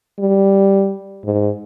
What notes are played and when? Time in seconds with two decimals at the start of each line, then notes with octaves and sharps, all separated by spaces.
0.20 G3
1.25 G#2